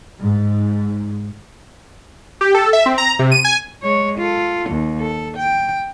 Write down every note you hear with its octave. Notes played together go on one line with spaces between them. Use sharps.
G#2
G4
A4
E5
C4
A#5
C3
D#7
G#5
G#3 C#5
F4 A4
D#2
A4
G5